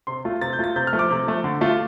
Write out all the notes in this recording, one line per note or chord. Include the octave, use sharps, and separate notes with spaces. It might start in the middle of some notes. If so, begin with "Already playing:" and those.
C3 C6
A3 F4
C3 A6
G6
A3 F4 A6
C3 G6
F6
F3 A3
D6
C3
F3 A3
D3
A3 F4